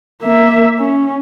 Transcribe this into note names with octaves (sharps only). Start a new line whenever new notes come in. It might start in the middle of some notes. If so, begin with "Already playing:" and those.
A#3 E5
C#4